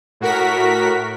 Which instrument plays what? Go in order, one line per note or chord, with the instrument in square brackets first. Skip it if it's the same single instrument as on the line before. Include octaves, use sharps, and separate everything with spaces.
[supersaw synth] A2 F#4 A#4 B6